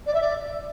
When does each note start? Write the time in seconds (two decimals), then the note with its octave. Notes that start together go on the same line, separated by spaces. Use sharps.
0.06 D5
0.14 E5
0.21 D5